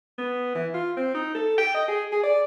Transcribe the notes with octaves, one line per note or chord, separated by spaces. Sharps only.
B3
E3
F4
C4
D#4
A4
G5
D#5
G#4
G#4
D5